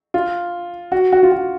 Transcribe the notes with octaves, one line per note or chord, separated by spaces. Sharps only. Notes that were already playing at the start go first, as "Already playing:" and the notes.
F4
F#4
F#4
F4
F#4